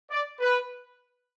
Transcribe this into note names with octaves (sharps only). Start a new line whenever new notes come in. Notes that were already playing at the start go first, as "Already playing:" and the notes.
D5
B4